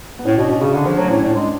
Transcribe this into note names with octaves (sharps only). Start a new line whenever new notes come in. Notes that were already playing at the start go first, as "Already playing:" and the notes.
B3
A2 C#4
B2 D4
B2 C#4
C#3 C#4
D3 D4
F3 C#4
F#3 A3
D4
A2 C#4
A2 D4
G#3